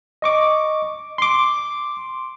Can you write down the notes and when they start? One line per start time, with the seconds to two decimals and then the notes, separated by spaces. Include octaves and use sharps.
0.22 D#5 C#6 D6
1.18 C6 D6